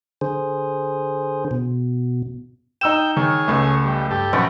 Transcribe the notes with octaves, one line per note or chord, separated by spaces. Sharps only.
D3 G#4 C5
B2
D#4 G5 E6 E7
D#3 G#4 C#5
C#2 A3
G3
G2 G4 A4
A#1 F#3 C#4 B4